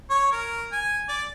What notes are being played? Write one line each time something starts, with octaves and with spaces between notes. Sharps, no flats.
C#5
A#4
G#5
D5